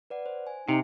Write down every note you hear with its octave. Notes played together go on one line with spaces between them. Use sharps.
B4 D5 F#5
C5
G#5
C3 D#4 E5